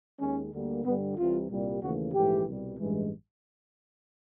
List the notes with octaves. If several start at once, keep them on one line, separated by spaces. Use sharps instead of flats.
D#2 D#3 G#3 C#4
D2 D3 G3 A#3
G2 D3 G3 B3
C2 C3 E3 G3 F4
C2 A#2 G3
D#2 C#3 E3 A3 F#4
A#1 G#2 E3 A3 G4
C2 B2 G3
A1 G2 E3 G#3